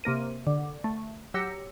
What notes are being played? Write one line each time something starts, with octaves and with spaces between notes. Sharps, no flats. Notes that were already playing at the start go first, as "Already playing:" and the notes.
C3 A#3 A#4 D#7
D3
A3
F#3 G4 E6 A#6 C#7